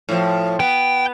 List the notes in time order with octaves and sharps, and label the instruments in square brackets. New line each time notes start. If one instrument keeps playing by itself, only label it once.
[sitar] A2 F3
[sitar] B3 [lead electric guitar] G5